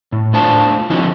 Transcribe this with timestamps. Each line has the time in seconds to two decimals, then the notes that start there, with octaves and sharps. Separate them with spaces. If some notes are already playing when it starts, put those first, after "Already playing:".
0.12 A2
0.33 A2 A3 D4 F4 C5 A5
0.90 D3 F3 C4 D#4 E4 F#4